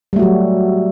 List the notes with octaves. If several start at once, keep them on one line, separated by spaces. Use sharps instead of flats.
F#3 G3 A3 F#4